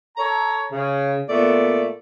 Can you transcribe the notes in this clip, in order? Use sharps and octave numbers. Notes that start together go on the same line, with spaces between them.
A4 C#5 A#5
C#3
A#2 A3 B3 D5